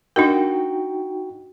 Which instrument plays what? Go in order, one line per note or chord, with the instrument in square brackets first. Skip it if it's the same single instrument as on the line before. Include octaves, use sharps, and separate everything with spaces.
[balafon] D4 A#4 [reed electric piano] D#4 F#4 G5